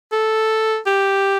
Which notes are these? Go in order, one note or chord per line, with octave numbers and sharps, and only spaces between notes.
A4
G4